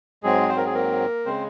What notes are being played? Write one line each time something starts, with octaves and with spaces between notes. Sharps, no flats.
G#2 F#3 G#3 C4 G#4
C5
A#4
G#4
A#3 A#4
C#3 G#3 C4 C5